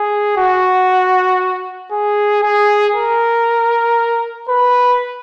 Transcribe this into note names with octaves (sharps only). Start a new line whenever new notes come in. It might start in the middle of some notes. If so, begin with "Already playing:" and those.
Already playing: G#4
F#4
G#4
G#4
A#4
B4